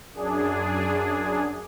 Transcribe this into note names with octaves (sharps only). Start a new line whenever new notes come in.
F#2 D4 G#4